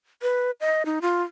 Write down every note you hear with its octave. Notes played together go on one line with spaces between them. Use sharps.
B4
D#5
D#4
F4